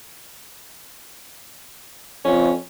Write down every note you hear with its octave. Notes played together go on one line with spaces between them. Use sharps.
F2 C#4